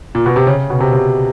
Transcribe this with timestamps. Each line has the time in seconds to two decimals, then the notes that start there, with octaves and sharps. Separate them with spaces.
0.15 A#2
0.26 B2
0.36 C3
0.47 C#3
0.70 B2
0.80 C3
0.93 C3